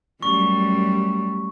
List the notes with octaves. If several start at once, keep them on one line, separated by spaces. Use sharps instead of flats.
F#2 G3 A3 C#6